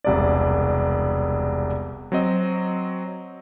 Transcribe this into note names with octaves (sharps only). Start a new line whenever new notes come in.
E1 C2 D5
F#3 C4 D#5